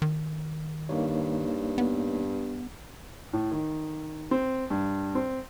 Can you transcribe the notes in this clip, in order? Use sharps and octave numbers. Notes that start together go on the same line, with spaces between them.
D#3
G2 A#3 D#4 C#5
B3
A2
D#3
C4
G2
C4